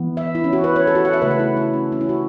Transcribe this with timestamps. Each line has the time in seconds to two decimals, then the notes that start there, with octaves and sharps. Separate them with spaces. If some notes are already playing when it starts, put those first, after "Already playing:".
Already playing: E3 B3
0.17 E5
0.35 E4
0.44 C#4
0.53 F#4
0.64 B4
0.76 C#5
0.87 A4
0.95 F#4
1.05 F#5
1.13 E5
1.22 C#3 A3 B4
1.31 A4
1.39 E4
1.57 E4
1.74 C#4
1.92 C#4
2.01 E4
2.09 F#4